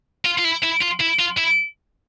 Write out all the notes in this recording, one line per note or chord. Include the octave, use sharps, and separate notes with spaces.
F4
F4
E4
E4
F4
E4
F4
E4